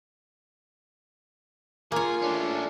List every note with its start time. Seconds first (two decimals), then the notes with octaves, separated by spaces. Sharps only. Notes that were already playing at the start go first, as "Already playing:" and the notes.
1.92 A#3 F4 G#4 C#5
2.22 A3 C#4 D4